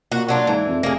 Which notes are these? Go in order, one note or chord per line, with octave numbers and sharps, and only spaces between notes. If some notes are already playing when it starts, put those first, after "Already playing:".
A#2 F#4
F#3 D4 F4
G#2 E3
F2
F1 A#3 G#4